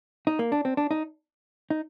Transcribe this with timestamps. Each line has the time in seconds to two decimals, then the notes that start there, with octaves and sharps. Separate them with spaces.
0.27 D#4
0.39 A#3
0.52 D4
0.65 C4
0.77 D4
0.91 D#4
1.70 D#4